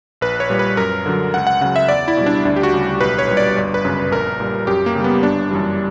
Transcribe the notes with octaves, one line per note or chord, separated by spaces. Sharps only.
A#1 B4
C#5
A#2 G3
B4
F#2 A#4
D3 F#3
C#2 F#5
F#5
C#3 F#3 F#5
E5
E2 D5
E4
B2 G3
D4
D2 D4
G4
F#4
C#3 G3
B1 B4
C#5
A#2 G3
D5
G1
B4
F#2 C#3
A#1 A#4
A#2 G3
F#2 G4
A#3
C#3 G3
B3
G1 D4
F#2 E3 G3